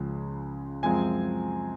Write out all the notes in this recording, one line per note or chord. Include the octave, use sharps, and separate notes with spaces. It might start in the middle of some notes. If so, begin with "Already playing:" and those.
Already playing: C#2 C#3 F3 G#3
F#2 F3 G#3 C4 G#5